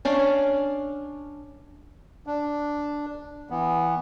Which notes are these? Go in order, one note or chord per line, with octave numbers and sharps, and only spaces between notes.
C#4 D4 F5
D4
E3 B3